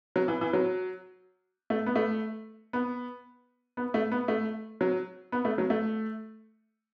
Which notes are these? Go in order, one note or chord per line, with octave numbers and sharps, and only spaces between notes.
F#3
E3
E3
F#3
A3
B3
A3
B3
B3
A3
B3
A3
F#3
B3
A3
F#3
A3